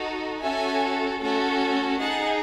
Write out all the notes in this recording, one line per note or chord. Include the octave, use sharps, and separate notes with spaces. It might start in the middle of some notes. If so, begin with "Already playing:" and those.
Already playing: D#4 F#4 A4
C#4 F#4 A4 E5 G#5
A3 C#4 F#4 A4
D#4 G#4 F#5 A5